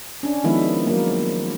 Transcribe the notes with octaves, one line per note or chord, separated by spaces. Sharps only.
C#4 D4
D#3 F3 G#3 B3 E4
F#3 A#3